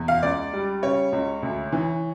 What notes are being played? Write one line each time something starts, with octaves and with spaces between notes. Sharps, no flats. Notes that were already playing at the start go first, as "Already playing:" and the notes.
Already playing: E2
F5
C#2 D5
G3
C#3 C#5
C#2
D2
E3